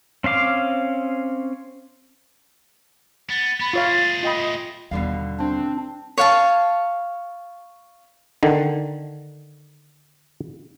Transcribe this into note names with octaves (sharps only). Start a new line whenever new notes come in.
C4 C#4 F5 D6
B3 A6
B3 B5
A3 F4 G#4 C#5 F5 A6
F4 D#5 G5 B5
D#2 B2 D3 G3 F5
C4 D4
C#5 F5 A5
D3 D#3